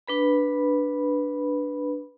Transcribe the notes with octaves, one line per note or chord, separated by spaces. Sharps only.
D4 B4 B5